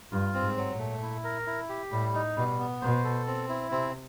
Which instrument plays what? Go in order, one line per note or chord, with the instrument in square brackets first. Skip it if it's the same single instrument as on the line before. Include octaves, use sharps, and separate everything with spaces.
[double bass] G2 [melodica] F4
[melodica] C4
[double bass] G#2
[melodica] F#3
[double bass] A#2
[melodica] A3
E4
A#4
E4
G4
[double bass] A2 [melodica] G3
[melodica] D#4
[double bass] B2 [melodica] G3
[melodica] B3
[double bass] B2 [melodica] C5
[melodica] A4
C4
E4
[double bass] C3 [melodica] C4